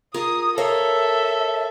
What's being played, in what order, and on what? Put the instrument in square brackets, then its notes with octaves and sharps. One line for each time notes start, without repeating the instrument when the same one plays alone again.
[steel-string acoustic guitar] F4 G#4 A#4 [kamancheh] D#6
[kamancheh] A4 E5 [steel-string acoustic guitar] A#4 C#5 F5